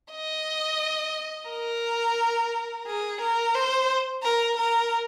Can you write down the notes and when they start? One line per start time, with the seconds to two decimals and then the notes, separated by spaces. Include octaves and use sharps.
0.12 D#5
1.49 A#4
2.87 G#4
3.21 A#4
3.55 C5
4.23 A#4
4.57 A#4